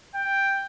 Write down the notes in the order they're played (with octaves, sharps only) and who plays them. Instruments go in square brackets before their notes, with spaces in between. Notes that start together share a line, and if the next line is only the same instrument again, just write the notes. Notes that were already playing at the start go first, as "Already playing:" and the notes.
[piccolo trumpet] G5